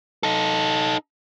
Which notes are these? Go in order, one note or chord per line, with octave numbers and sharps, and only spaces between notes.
D#4 A4